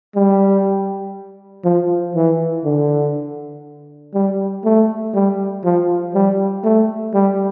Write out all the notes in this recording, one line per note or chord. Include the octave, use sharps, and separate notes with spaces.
G3
F3
E3
D3
G3
A3
G3
F3
G3
A3
G3